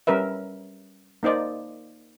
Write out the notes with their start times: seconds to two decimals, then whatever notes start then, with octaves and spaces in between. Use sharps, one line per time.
0.07 G3 C#4 A#4 B4 E5
1.23 A#3 D#4 C5 D5 D#5